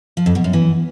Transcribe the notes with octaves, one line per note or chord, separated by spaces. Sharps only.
F3
F2
B2
F#2
E3